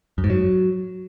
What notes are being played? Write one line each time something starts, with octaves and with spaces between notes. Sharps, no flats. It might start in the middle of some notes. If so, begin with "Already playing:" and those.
F#2
G#2
F#3